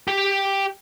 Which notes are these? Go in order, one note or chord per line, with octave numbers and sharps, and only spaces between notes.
G4 G5